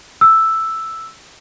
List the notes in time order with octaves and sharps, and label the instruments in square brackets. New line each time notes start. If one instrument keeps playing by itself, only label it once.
[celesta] E6